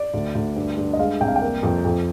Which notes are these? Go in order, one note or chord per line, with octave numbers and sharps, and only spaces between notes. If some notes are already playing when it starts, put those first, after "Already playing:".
Already playing: D5
D2
D2
G2
G2
D#5
G#3 F5
C2 G5
F5
G5
A#3
F2
F2